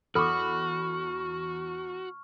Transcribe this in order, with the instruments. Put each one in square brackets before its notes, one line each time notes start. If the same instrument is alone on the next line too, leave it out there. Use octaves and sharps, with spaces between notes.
[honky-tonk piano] E2 B5 [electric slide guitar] F#4 [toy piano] A4 D6 [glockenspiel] C#6 F6